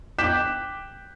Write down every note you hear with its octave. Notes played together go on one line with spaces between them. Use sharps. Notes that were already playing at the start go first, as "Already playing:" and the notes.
G5 D6 F#6 G6 B6 E7